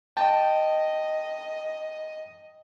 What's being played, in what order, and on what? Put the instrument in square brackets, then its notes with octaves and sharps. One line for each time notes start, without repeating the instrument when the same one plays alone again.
[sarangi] D#5 [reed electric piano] G5 A5